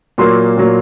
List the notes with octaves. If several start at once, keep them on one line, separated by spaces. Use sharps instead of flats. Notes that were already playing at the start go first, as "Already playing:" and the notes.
A#2 F#3 A#3 C6
A#2 F#3 A#3